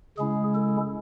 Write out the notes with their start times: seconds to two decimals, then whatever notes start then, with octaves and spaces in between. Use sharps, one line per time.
0.18 C#3 G#3 C#4 E4 G#4
0.55 A4